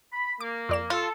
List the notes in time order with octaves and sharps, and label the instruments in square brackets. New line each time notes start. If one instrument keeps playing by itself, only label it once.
[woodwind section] B5
[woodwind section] A#3 [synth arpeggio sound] D6
[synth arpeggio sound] F2 D5 E7
[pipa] F4 [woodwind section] A4